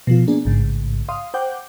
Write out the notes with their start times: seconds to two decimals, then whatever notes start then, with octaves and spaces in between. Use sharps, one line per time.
0.07 B2 F3 F4
0.28 A#3 B3 D4 G#4
0.45 A1 G#2 C#3
1.09 F5 C6 D#6
1.34 C5 F#5 G5 D6 G6